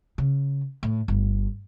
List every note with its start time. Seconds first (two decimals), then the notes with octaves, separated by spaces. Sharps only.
0.18 C#3
0.83 A2
1.08 G1